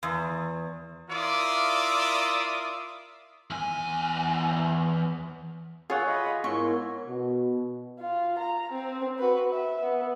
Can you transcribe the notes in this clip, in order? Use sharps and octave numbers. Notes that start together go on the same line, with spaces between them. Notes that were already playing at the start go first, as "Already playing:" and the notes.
E2
E4 F4 A#4 D5 E5 D#6
E2 G#5
F4 G#4 C#5 F#5 E6
D#5 F5 B5
G#2 B3 E4 A#4 C#5 C#6
B2
F4
A#5
C4
F#4 B4
E5
B3